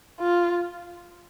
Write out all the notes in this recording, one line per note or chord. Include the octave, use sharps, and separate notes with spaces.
F4